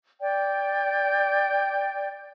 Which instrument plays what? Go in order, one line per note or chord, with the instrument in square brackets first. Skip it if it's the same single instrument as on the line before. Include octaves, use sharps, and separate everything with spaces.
[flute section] D5 G5